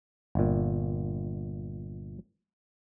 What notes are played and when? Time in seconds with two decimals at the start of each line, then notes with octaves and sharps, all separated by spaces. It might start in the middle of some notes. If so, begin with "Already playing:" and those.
0.35 G1 A#2